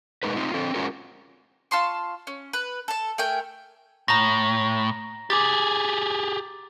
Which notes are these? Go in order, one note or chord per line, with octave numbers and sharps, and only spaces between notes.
G#3 D#4 A#4 B4
C4 D#4 F4
D3 C4 A4
G#3 C#4 F4 F#4 G#4 A#4
F4 A5 C6 C#6
C#4
B4
A4 A5
A3 A#4 G5 G#5
A2 A#5 A#6
G4 G#4 D6 A6